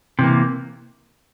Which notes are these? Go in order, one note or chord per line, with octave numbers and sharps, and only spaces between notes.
C3 E3 A#3